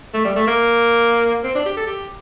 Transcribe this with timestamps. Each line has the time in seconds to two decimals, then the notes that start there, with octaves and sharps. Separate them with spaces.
0.14 A3
0.24 G3
0.36 A3
0.47 A#3
1.44 C4
1.55 D4
1.65 G4
1.77 A4
1.87 G4